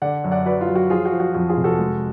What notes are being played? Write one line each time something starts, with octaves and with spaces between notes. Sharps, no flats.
D3 D5 F#5
F#2
D5 F#5
F#3 B4 D5
F4
F#3
F#4
F3 F4 G#4
F#4
F3
F#4
F2 F#4
F4 G#4
F1
F#4 A4
G#3